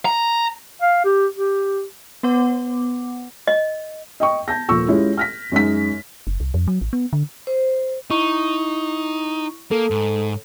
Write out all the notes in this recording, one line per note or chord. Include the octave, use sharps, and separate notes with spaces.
A#5
F5
G4
G4
B3 B4 F#5 D6
D#5
D#5 G5 C#6
A5 G6 A#6
D#1 A#2 F3 C#6 E6
G#3 C#4 E4 F4 G4
F6 A#6 B6
F#2 G#3 D#4 B6
F#1
C2
F2
F#3
A1
B3
D3
C5
D#4 E4 C#6
A#3 A4
G#2